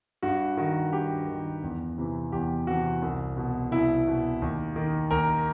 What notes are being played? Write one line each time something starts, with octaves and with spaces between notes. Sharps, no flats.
G2 F#4
D#3 F#4
G2 G4
D#3
E2
C3 E3
E2 G4
C3 E3 F#4
C2
B2
C2 E4
B2
D#2
D#3
D#2 A#4